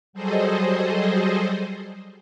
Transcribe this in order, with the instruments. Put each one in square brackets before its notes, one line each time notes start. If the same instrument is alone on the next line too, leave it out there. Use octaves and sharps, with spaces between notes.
[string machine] F#3 G3 G#4 A4 C5 D#5